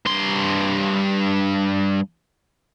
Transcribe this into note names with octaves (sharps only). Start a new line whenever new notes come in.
G2 C6